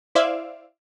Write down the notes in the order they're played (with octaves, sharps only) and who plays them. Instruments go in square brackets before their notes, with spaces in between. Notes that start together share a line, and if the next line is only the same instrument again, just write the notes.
[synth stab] E4 C5 D5 E5 F5